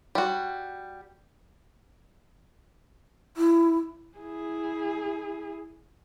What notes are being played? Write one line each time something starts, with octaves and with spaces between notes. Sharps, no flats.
G3 F#4
E4
E4 G#4